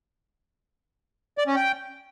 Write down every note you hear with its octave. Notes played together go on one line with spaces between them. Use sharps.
D5
C#4
G5